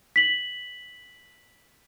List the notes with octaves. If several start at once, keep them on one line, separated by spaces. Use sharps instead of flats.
B6 F#7